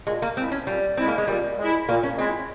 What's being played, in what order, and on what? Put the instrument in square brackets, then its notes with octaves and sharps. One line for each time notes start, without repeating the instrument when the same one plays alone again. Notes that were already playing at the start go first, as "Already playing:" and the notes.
[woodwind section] A#2 [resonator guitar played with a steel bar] G#3
[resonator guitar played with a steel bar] A#3
[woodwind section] G#3 E4 [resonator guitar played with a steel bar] C4
[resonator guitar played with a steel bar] C#4
[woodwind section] A#2 [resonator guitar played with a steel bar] G3
[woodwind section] G#3 E4 [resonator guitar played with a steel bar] C4
[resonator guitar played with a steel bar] A#3
G#3
[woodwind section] A#2 [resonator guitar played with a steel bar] G3
[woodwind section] G#3 E4
[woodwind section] A#2 [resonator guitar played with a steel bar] A#3
[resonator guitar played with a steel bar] C#4
[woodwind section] G#3 E4 [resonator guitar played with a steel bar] C4